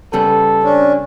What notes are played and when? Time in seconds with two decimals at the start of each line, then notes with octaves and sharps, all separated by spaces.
0.13 C#3 G3 B3 A4
0.64 C#4 D4